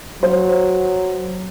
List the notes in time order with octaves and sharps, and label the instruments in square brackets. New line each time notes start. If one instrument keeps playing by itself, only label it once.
[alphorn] F#3 [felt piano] C5